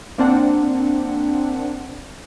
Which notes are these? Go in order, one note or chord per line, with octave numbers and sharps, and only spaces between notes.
A#3 C4 D4 F#5